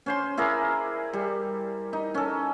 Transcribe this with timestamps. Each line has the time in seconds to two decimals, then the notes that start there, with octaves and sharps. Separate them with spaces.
0.06 C#4 C5 C6
0.37 E4 G#4 A#4 D5
1.13 G3
1.93 D#4
2.15 C#4 A4